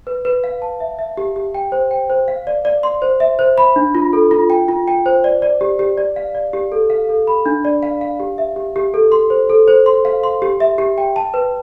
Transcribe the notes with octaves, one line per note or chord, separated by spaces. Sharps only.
B4
B4
F5
A5
E5
E5
G4
G4
G5
C5
G5
C5
F5
D5
D5
C6
C5
E5
C5
B5
D4
F4
A4
F4
G5
F4
G5
C5
D5
D5
G4
G4
D5
F5
D5
G4
A4
F5
A4
B5
D4
D5
F5
F5
G4
E5
G4
G4
A4
C6
C5
A4
C5
C6
F5
C6
G4
E5
G4
G5
A5
B4